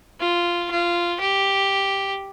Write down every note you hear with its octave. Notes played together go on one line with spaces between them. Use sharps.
F4
F4
G4